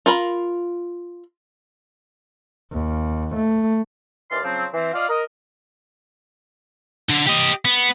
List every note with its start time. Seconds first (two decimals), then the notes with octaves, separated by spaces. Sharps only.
0.06 F4 A#4 B5
2.72 D#2
3.36 A3
4.30 D#2 E3 D5 F5 C6
4.44 C#3 F3 F#3 C4
4.73 E3 C4
4.93 F4 D5 D#5 F5
5.09 A#4 D#5
7.10 D3
7.27 G4 D#5
7.65 B3